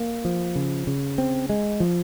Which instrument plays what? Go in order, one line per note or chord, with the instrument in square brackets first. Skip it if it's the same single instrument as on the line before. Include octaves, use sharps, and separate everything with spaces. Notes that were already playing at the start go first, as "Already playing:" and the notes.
Already playing: [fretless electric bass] A#3
F3
C#3
C#3
C4
G#3
F3